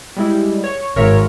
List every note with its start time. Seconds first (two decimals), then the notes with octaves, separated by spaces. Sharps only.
0.17 G3 G#3 E4
0.64 C#5
0.96 G#1 A#4 C#5 E5